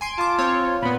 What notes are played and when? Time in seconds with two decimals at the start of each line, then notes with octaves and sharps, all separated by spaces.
0.01 G#5 C6 D7
0.18 F4 A5 D6
0.38 C4 C#5
0.82 A#2 B3 B5